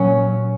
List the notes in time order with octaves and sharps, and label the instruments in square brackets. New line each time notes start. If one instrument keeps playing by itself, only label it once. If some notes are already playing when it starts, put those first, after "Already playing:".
Already playing: [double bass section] A#2 F#3 C#4